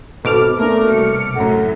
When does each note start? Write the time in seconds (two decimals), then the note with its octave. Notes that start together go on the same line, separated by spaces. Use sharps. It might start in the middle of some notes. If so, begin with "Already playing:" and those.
0.25 G#1 B2 A4 D6 F6
0.58 A3 A#3 D4 A#4
0.89 C2 C#7
1.36 F#2 A2 A3 F#5 A#5